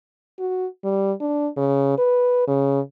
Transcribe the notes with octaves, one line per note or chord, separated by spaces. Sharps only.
F#4
G3
D4
C#3
B4
C#3